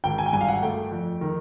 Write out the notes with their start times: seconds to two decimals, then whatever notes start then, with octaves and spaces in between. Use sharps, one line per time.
0.04 G#1 G5
0.18 G#5
0.26 G5
0.33 G2 G#5
0.41 F5
0.48 F#5
0.63 A3 G5
0.92 F2
1.21 D#3